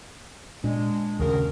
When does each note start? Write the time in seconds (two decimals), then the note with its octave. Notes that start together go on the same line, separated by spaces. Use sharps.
0.64 A#2 G#3 D4
1.19 D#2 C#3 F#4 G#4 A#4